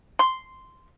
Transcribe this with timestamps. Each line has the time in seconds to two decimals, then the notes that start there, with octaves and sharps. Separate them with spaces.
0.19 C6